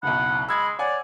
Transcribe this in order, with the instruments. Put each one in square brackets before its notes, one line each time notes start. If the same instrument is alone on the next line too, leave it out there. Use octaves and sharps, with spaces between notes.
[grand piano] F#1 B1 [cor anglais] F#5 [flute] B5
[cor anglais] G#3 [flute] B5 [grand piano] E6 G#6
[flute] C#5 [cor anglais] D5 [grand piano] F#5 G#5